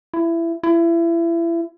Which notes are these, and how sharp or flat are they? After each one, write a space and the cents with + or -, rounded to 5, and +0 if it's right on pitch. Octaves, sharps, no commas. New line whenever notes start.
E4 +20
E4 +30